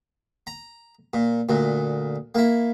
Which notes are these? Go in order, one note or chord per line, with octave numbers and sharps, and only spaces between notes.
A#5
A#2
D2 A#2
A#3 E4